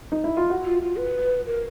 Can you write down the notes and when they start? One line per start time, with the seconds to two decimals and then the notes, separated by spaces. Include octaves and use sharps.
0.12 D#4
0.24 E4
0.37 F4
0.50 F#4
0.66 F4
0.82 F4
0.98 B4
1.46 A#4